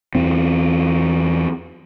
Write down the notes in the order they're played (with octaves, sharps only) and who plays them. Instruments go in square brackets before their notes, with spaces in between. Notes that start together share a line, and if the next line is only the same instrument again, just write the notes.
[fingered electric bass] E2 E3 C4